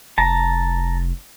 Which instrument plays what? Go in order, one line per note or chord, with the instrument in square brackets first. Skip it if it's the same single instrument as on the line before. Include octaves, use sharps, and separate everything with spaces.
[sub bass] F1 [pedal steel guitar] A5 A#5